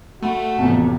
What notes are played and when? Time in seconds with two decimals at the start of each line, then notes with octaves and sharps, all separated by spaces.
0.22 A3 F#4 F#5 B5 D#7
0.59 A1 F2 C3 E3 B3 C4